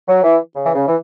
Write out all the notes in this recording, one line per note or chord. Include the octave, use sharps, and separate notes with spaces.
F#3
E3
C#3
E3
C#3
E3